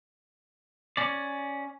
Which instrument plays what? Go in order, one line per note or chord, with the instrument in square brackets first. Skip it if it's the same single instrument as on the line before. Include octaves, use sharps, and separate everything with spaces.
[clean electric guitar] C#4 D5